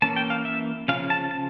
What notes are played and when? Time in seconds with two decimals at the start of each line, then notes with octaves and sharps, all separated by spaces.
0.02 E3 A#3 C#4 A5
0.16 G5
0.30 F5
0.45 E5
0.88 C#3 F3 C#4 F5
1.10 A5
1.31 A5